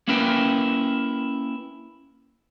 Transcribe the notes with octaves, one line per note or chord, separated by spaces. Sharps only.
A#3 C#4 E4 A#4 B4 G5